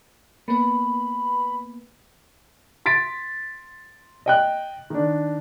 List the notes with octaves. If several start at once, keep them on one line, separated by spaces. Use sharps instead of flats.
A#3 B3 B4 B5
C6 A6 B6 D7
D#5 G5 F#6
D#3 D4